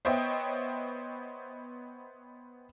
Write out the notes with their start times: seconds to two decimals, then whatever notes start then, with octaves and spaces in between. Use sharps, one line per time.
0.05 B3 C5 C#5 D#5 E5 G5